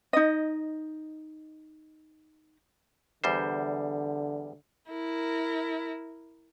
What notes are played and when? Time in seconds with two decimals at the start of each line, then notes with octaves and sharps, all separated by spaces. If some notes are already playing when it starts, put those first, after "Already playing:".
0.13 D#4 D#5
3.24 E2 D3 G3 C5
4.89 E4 A#4